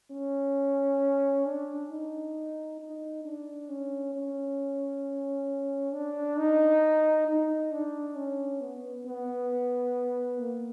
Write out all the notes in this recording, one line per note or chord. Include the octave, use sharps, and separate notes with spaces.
C#4
D4
D#4
D#4
D4
C#4
C#4
D4
D#4
D#4
D4
C#4
B3
B3
A#3